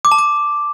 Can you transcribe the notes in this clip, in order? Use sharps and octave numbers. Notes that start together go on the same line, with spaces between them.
D6
A5
D6